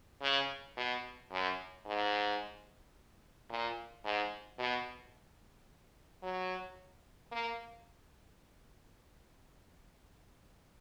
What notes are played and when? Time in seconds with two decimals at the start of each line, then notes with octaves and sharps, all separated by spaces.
0.22 C#3
0.77 B2
1.31 F#2
1.86 G#2
3.50 A#2
4.05 G#2
4.59 B2
6.23 F#3
7.32 A#3